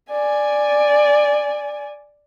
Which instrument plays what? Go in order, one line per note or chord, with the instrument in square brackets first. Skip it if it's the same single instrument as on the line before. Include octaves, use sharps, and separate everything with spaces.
[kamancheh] D5 G#5